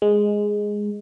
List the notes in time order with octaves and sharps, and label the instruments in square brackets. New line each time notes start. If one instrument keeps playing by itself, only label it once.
[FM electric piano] G#3